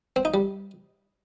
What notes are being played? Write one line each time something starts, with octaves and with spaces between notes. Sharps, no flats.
C4
D#4
G3